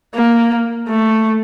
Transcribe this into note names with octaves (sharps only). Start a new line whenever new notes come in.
A#3
A3